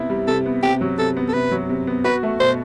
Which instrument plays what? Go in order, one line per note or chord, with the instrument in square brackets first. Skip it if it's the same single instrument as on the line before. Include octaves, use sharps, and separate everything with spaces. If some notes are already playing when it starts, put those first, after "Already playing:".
Already playing: [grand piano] C3 B3 E4
G3
[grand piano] C3 [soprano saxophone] A4
[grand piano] B3
[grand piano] C3 [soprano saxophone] G4
[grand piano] F#3
[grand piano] C3 [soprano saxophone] A4
[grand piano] B3
[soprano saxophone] A4
[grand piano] C3 [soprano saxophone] B4
[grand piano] F#3
C3
B3
[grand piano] F#4 [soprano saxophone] B4
[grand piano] A3
[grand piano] B2 [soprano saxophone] C5